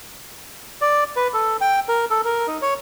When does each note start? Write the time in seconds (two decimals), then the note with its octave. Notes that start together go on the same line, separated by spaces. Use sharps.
0.81 D5
1.16 B4
1.34 A4
1.61 G5
1.88 A#4
2.11 A4
2.25 A#4
2.47 D#4
2.62 C#5